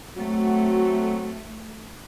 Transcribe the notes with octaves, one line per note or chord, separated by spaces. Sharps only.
F#3 A3 C4 F#4